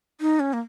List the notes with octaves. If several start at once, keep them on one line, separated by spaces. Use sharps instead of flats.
D#4
C#4
A#3